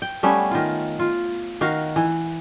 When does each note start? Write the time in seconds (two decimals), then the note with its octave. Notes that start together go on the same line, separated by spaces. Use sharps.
0.02 G5
0.23 G3 A3 B3 C#4
0.51 D#3 F4
0.99 F4
1.61 D#3 F#4 F5
1.96 E3